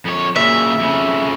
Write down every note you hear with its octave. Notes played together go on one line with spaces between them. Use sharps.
F2 C#5
A#2 C#3 E5
F2 C#3